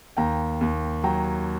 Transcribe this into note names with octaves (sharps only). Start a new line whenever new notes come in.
D#2 G5 A#5
D#2
F#3 G5 A#5